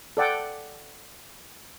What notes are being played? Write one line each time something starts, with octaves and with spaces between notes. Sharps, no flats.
A4 D5 F#5 G5